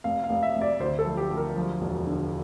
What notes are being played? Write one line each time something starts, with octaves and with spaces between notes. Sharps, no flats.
F1 F5
F5
F1
E5
F1
D5
D2 C5
A4
F3
G4
D2
A#4
F3
E1
D3